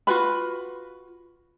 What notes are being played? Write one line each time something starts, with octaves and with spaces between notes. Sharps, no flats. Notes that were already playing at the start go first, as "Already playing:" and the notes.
F4 F#4 B4 B5